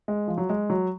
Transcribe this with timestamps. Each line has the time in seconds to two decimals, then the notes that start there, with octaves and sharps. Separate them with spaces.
0.08 G#3
0.27 F3
0.38 F#3
0.49 G#3
0.70 F#3